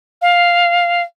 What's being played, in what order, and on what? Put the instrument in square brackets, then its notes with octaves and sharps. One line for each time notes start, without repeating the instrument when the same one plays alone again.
[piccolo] F5